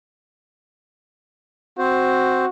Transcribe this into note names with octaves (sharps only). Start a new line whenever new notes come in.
C4 F#4 C5